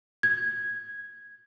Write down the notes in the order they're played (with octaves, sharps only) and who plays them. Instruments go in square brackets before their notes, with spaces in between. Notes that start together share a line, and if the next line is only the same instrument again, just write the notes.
[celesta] G#6